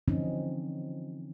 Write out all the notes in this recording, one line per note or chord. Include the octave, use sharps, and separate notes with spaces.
D3 E3 F3 C4 C#4 D#4